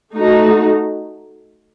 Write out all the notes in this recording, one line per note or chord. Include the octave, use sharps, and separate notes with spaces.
A3 D#4 F#4